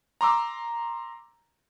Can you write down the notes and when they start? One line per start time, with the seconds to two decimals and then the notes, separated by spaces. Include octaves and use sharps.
0.21 A#5 C6 D6 E6